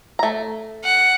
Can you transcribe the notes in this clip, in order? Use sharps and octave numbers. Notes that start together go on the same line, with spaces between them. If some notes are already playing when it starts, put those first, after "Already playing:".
A3 A#5
F#5